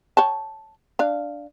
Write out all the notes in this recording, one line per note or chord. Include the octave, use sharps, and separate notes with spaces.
C#5 G5 A5
D4 F5